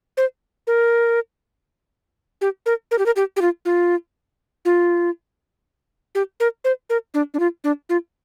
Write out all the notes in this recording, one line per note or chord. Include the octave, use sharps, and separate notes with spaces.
C5
A#4
G4
A#4
A#4
G4
A#4
G4
G4
F4
F4
F4
G4
A#4
C5
A#4
D4
D4
F4
D4
F4